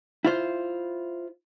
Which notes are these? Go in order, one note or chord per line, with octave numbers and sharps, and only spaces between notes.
E4 F4 C5